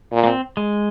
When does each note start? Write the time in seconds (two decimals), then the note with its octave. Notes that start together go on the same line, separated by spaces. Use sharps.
0.12 A#2
0.23 A#3
0.27 C4
0.57 G#3